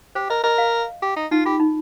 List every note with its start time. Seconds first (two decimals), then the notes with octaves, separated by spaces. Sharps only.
0.15 G4 C5
0.30 A#4 D#5
0.44 A#4 D#5
0.58 F5
1.02 G4
1.16 D#4
1.31 D#4 F4
1.45 F4 G4
1.60 D#4